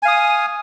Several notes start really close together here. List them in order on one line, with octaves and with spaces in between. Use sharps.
G#5 F5 D#6